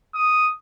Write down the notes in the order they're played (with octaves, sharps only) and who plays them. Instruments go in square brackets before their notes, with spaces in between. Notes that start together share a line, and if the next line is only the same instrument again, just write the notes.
[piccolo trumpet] D#6